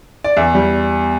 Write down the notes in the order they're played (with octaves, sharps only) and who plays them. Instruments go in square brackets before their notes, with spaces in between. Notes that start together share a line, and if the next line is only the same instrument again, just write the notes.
[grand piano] D5
E2 E5
G3